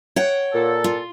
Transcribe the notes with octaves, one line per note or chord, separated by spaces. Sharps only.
C#5 F#5 G5
A#2 A4
F4